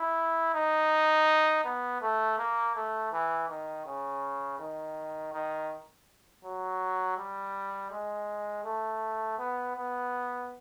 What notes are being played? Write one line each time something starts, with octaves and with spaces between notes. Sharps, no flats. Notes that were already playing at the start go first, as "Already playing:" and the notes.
Already playing: E4
D#4
B3
A3
A#3
A3
E3
D#3
C#3
D#3
D#3
F#3
G3
G#3
A3
B3
B3